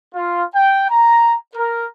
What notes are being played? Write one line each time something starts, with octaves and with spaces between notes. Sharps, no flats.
F4
G5
A#5
A#4